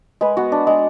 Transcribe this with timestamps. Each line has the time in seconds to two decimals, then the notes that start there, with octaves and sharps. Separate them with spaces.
0.21 G#3 B4
0.37 B3 F#4
0.52 D4
0.67 G#3